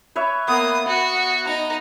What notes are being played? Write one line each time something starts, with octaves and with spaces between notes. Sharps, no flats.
B4 C#5 E5
A#3 B3 D#6
F#4 F#5
D#4 A#5